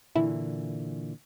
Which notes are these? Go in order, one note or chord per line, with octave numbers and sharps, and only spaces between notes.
A#2 D3 E3 E4